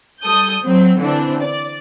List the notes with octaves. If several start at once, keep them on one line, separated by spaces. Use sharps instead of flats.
G3 A4 D#6 G6
F#3 C4
D3 E3 C4 D4
D5